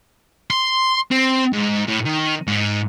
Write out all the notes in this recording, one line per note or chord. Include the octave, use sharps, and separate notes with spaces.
C6
C4
G#2
A2
D#3
G#2